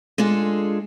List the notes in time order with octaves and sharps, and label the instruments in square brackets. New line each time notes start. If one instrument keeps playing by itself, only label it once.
[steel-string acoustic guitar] G#3 D4 F4 G#4 A4